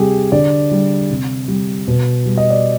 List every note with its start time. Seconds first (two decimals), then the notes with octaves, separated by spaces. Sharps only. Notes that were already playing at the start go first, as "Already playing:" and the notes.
Already playing: C3 G3 G4 G#4
0.32 D3 D5
0.71 G3
1.10 C3
1.48 G3
1.88 B2
2.26 G3
2.37 D#5
2.50 D5